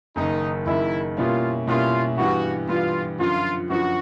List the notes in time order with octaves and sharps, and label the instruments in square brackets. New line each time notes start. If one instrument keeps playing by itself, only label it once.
[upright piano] F#1 F#2 D#3 [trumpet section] D#4
[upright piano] F#1 F#2 D#3 [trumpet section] E4
[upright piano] B2 G3 A#3 C#4 E4 [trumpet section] F4
[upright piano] B2 G3 A#3 C#4 E4 [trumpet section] F4
[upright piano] G2 E3 G3 B3 [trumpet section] F#4
[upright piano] G2 E3 G3 B3 [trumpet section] F4
[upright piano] F#2 D3 F3 [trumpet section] F4
[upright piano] F#2 D3 F3 [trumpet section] F#4